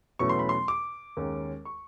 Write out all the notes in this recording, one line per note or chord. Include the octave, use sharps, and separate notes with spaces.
E2 B2 F#3 A3 C#4 C#6
C6
B5
C6
D6
D#2 D#3 G#3 C#4
C#6